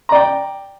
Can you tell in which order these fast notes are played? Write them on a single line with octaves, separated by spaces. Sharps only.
A#5 D5 G5